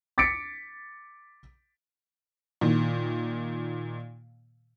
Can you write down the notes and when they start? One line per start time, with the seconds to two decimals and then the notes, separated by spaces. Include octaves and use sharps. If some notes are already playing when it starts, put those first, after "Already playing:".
0.18 D6 A6 B6 C#7 D7
2.61 A#2 D#3